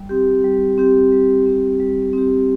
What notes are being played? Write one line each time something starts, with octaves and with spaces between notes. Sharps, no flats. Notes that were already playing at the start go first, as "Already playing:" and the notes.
Already playing: G3
C4 G4
G3
C4 G4
G3
C4 G4
G3
C4 G4